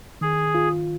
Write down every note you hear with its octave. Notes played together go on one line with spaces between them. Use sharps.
D#3 G#4
F4